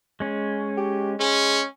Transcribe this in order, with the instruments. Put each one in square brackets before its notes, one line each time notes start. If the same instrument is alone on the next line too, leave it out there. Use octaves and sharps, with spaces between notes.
[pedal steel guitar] G#3 C#4
[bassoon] G4
[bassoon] G#3 [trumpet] C#4